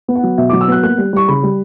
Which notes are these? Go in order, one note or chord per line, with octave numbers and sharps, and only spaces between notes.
B3
F#5
F#3
B2 E5
F#3 D6
E6
B3 F#6
A#3 F#6
G3
G3 C#6
C#3 B5
G3